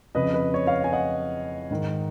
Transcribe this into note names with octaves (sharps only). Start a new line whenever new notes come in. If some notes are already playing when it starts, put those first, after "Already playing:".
F2 C#3 B4 D#5
B4
C#5
C#5 F5
G#5
D#5 F#5
G#2 D#3